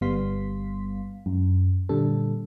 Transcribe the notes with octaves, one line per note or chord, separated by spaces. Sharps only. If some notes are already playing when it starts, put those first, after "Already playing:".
G1 G3 B3 F5 C6 B6
F#2
A#2 D3 G3 A4